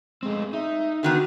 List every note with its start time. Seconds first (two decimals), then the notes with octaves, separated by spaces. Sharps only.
0.23 G#3 A3 C4
0.53 D#4 E5
1.03 D3 D#3 B3 F#4